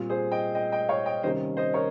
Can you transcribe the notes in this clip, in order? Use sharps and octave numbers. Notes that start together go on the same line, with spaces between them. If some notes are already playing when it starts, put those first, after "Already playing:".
Already playing: A#2 G3 C4
G#4 C5
D#5 G5
D#5 G5
D#5 G5
C#5 F5
D#5 G5
C3 D#3 G3 A#3 C#4 C5 D#5
C5 D#5
A#4 C#5